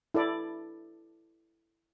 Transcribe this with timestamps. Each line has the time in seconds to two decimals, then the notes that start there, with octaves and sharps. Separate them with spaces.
0.14 E4 A4 D5